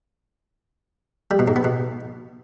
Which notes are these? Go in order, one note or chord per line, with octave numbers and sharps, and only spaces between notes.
G3
B2
G#2
B3
B2